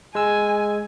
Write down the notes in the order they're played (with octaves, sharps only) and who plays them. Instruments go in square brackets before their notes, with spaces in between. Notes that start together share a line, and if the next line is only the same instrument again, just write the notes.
[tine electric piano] G#3 E6 [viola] G#5